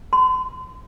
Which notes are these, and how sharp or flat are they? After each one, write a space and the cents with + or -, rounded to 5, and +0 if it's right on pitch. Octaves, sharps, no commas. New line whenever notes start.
C6 -40